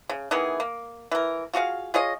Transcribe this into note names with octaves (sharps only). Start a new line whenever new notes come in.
C#3
D#3 E3 B3 G#4
A#3
E3 A#4
F4 F#4 G#4 F5
F4 G#4 C#5 D#5